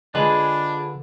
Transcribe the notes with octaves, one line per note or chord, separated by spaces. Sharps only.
D3 G#3 D4 F4 G#4 B4